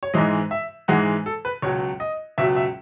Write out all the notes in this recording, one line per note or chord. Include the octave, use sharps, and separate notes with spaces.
C#5
G#2 E3 G#3 D#5
E5
G#2 E3 G#3 F#5
A4
B4
C#2 B2 F#3 C#5
D#5
C#2 B2 F#3 E5
E5